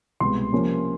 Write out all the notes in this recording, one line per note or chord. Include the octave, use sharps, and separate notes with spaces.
C2 B2 G#3 B3 C6
C3 F3 A#3 C#4